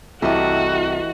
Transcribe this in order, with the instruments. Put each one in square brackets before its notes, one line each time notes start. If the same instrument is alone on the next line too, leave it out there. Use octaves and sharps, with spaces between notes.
[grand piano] C2 [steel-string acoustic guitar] E3 D#5 [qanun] A3 G4 A4 [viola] F#4